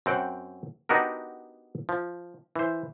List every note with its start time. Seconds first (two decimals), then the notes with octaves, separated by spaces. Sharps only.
0.06 F#2 C4 F#5 G5
0.89 B3 D4 D#4 F#4 G4 A#4
1.89 F3
2.56 E3 C5